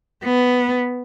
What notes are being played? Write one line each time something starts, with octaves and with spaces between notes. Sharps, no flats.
B3